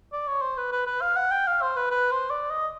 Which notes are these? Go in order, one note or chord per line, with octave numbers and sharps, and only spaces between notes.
D5
C#5
C5
B4
B4
B4
F5
F#5
G5
F5
C5
B4
B4
C5
D5
D#5